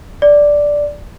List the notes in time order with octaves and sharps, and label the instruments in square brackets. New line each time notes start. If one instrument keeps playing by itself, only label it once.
[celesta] D5